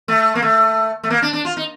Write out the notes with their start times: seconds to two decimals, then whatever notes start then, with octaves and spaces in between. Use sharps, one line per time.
0.08 A3
0.35 A#3
0.42 A3
1.03 A3
1.10 A#3
1.22 D4
1.33 D4
1.45 F4
1.57 D#4